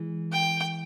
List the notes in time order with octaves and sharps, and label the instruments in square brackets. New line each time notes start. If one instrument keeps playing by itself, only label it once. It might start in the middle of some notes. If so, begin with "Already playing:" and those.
Already playing: [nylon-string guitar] E3 G#3
[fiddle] G5